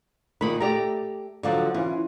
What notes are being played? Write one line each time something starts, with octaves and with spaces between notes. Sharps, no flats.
A#2 D#3 B5
A3 G4 D5 A#5
D3 F3 F#3 D5
E3 C#4 F4